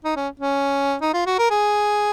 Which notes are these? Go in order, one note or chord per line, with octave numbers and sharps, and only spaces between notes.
D#4
C#4
C#4
D#4
F4
F#4
A#4
G#4